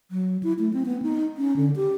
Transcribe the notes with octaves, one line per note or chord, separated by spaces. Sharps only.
F#3
E4
A3
C4
B3
D#4
C#4
D3
G4